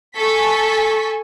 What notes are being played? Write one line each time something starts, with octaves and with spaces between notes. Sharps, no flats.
A4 G#5 C#6 B6